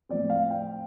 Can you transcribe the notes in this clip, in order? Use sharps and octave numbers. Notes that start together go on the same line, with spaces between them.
A2 F3 C4 D5
F5
G5